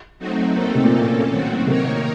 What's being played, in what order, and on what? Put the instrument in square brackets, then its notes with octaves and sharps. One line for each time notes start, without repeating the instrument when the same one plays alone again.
[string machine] F#3 A3 C4 D#4 F#4
[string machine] A3 C4 D#4 A4 [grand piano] A#3
[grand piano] A#3
C3
A#2
[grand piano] A2 [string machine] A#3 C#4 A4
[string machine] D#3 F#3 A3 C4 F#4
[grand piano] C3 [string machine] D#3 A#3 D#4 A#4 C#5